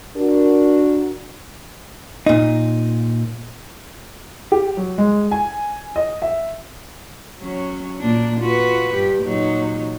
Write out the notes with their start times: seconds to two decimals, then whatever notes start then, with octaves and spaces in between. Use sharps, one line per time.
0.17 D4 F#4 A#4
2.26 A#2 D#4
4.52 G4
4.77 F#3
4.98 G#3
5.31 G#5
5.96 D#5
6.22 E5
7.40 F#3 C#4
8.00 A#2 A#3 D4
8.40 F4 F#4 B4
8.93 G2 G4
9.23 A#2 F#3 D#4